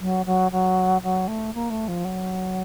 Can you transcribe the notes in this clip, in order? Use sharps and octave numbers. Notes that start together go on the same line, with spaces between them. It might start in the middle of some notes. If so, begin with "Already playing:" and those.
F#3
F#3
F#3
F#3
A3
A#3
A3
F3
F#3